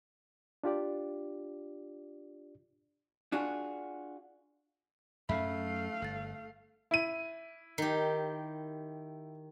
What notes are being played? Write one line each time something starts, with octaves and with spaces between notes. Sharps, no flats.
D4 F4 G4 D5
D4 F4 F#4 G#4
F#2 F#3 A3 C#4 E5 F5 B5
G1 A4 A6
E4 D#7
D#3 G4